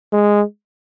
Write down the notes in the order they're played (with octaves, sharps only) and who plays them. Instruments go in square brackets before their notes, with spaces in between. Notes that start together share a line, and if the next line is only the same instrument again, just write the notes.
[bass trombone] G#3